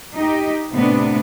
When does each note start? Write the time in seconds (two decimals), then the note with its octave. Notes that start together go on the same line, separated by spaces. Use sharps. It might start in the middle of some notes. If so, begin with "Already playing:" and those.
0.15 D#4 G4 D#5
0.72 A2 C3 B3 D4